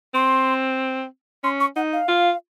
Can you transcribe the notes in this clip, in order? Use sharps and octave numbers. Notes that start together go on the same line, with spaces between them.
C4 C6
C#4 C6
C#6
D#4 F#5
F5
F4